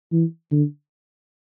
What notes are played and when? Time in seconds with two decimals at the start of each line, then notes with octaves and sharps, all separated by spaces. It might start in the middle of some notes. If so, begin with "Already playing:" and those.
0.12 E3
0.52 D3